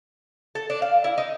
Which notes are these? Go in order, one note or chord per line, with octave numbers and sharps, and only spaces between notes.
A4
D4
F5
E4
D#4